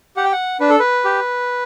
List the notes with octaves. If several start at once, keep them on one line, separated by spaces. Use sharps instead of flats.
G4 F#5
G5
F#5
D4 B4
A4
B4
G4